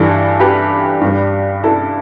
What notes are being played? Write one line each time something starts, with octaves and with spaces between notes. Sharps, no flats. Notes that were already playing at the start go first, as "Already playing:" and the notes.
Already playing: G2 E3 G3 E4 A4
G4 B4
G2 G3
E4 A4